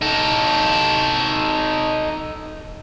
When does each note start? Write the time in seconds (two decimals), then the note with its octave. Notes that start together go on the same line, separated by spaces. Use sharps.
0.02 D#4 A4